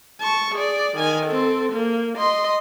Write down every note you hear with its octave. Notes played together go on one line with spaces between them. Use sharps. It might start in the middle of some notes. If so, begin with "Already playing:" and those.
A5 C#6
G#4 D5
D#3 G#5
C4 A4
A#3
D#5 C6